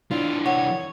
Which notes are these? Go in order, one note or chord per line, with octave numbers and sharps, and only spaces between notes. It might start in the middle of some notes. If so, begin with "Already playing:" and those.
E3 D4 E4 F4
C#5 F#5